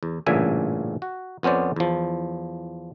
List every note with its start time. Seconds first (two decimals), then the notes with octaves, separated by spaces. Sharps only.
0.03 E2
0.26 A1 G2 A#2 C#3 E5 G#5
1.02 F#4
1.43 F2 B3 C#4 C5 D5
1.76 E2 F3